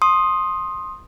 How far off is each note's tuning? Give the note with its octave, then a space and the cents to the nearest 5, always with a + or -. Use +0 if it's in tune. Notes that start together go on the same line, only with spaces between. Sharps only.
C6 +15 D#6 +0